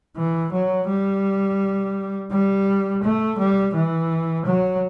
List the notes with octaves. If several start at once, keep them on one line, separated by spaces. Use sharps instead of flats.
E3
F#3
G3
G3
A3
G3
E3
F#3